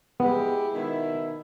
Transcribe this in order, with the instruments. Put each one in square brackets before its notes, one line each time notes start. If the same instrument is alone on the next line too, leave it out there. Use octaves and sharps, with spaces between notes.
[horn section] G#3 E4 G4 [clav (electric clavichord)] B3
[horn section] B2 D#3 E4